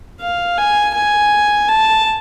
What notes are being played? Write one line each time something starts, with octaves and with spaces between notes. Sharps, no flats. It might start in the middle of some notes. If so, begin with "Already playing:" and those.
F5
G#5
G#5
A5